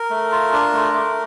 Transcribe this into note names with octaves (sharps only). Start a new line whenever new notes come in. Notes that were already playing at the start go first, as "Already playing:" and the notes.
Already playing: A#4
A3
F4
D4
A3
A3